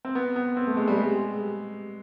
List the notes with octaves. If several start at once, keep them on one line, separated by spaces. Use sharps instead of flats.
C4
B3
B3
C4
A3
G#3
G3
G#3